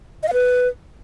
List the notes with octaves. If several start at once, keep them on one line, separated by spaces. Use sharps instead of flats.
D#5
F5
B4